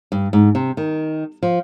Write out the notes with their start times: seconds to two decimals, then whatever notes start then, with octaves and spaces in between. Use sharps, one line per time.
0.12 G2
0.33 G#2
0.55 C3
0.77 D#3
1.43 F3